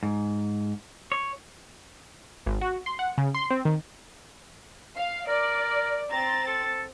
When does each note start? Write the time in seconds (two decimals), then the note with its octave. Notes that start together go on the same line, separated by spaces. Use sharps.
0.03 G#2
1.12 C#5
2.46 G#1
2.61 F#4
2.86 C6
2.99 F#5
3.18 C#3
3.34 C6
3.50 C4
3.65 D#3
4.97 F5
5.28 A#4 D5
6.11 C4 A#5 A6
6.47 A4